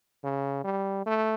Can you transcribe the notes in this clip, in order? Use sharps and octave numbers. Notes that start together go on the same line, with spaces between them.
C#3
G3
A3